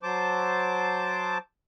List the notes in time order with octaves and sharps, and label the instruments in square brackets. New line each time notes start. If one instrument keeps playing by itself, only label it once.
[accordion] F#3 C5 A5 D6